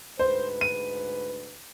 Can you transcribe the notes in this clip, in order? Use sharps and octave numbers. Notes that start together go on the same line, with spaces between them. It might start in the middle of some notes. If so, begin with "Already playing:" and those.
D2 G#2 B4 C5
D#7